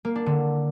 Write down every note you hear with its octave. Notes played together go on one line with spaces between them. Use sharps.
A#3
D4
D3